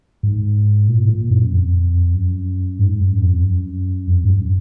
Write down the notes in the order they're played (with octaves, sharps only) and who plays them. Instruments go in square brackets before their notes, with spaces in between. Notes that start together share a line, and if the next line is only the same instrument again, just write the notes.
[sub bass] G#2
A#2
A#2
F#2
F2
F#2
G#2
F#2
F2
F#2
F2
G#2
F#2